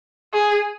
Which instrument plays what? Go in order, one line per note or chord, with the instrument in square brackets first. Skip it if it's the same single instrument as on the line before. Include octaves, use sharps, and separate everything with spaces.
[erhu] G#4